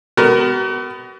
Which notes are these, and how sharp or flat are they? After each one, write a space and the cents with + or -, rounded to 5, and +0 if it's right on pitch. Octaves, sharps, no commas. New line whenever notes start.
B3 +25 F#4 +40 A#4 +10